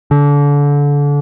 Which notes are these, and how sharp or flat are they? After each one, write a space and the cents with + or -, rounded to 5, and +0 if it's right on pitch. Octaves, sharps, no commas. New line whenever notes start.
D3 -30